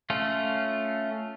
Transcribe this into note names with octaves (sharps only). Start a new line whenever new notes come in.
A3 C#4 F4